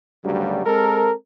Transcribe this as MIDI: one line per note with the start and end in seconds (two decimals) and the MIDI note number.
0.24 0.63 38
0.24 0.63 43
0.24 0.63 49
0.24 0.63 54
0.24 0.63 55
0.66 1.13 56
0.66 1.13 60
0.66 1.13 69
0.66 1.13 70